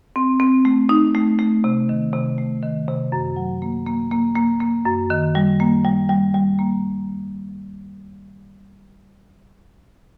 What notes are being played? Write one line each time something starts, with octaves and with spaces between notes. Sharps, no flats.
C4
C4
A3
D#4
A3
A3
C3
D#3
C3
A3
D#3
C3
F#2
F#3
A#3
A#3
A#3
A#3
A#3
F#2
D#3
G3
A#3
G3
G3
G3
A#3